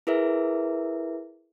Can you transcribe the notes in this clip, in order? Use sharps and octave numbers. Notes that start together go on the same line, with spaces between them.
E4 G#4 A#4 B4 E5